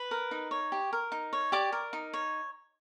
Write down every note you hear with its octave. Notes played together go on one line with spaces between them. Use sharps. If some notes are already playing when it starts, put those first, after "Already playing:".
Already playing: B4 B5
A#4
D#4
C#5
G4
A#4
D#4
C#5
G4 D5 D6
A#4
D#4
C#5